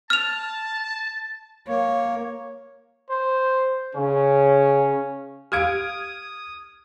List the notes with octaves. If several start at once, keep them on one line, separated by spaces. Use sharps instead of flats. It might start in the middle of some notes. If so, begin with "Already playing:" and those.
A5 F6 F7
A#3 C#5
C5
C#3 C#4
G4 F5 D#6 F6 G#6 D7